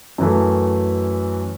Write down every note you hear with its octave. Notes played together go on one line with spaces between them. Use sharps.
F#2 E3 A3